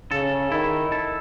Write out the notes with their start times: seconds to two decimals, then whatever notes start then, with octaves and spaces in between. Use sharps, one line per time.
0.11 C#3 A4
0.51 D#3 E4
0.92 A4